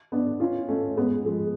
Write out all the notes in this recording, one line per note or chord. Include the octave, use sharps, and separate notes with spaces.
B3 D4
C#4 F4
A3 C#4
G#3 B3
F3 G#3